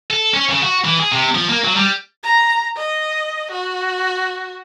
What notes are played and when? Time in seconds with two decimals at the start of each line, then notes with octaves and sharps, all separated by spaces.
0.10 A4
0.34 C#4
0.50 C#3
0.63 F#4
0.85 E3
1.00 G#4
1.12 C3
1.35 F3
1.49 A#3
1.64 F#3
1.76 G3
2.23 A#5
2.76 D#5
3.51 F#4